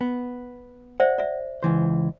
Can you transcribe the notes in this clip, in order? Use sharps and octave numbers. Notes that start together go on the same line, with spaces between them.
B3
C5 D5 E5 F#5
D5 E5
C#2 E3 C5